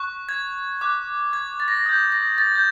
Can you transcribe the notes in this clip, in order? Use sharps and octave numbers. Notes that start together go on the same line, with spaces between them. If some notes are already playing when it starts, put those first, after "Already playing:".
Already playing: C#6 F#6
G#6
D6 F#6
G#6
A6
A#6
A6
D#6 G6
A#6
A6
G6